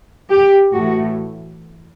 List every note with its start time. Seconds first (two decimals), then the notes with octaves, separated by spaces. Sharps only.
0.31 G4
0.74 A2 E3 A3 F#4